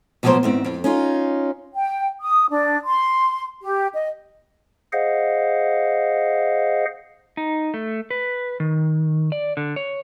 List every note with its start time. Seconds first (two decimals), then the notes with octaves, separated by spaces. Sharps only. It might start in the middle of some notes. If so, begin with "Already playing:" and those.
0.23 B2 F3 F#3 G#3 A#3 C5
0.43 E2 G#2 C4
0.65 F2
0.84 C#4 D#4 F4
1.75 G5
2.20 D#6
2.49 D4
2.85 C6
3.61 G4
3.93 D#5
4.93 G#4 C5 D#5 F5 F#5
7.37 D#4
7.74 A3
8.11 B4
8.60 D#3
9.32 D5
9.57 D3
9.76 C#5